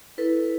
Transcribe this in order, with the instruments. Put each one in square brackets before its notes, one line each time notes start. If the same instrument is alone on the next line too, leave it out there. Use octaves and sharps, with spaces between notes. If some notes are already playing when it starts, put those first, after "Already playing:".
[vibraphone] E4 A4 B4